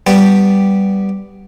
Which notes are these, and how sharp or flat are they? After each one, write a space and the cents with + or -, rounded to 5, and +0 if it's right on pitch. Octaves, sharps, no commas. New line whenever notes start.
G3 -5 B3 +0 G4 +0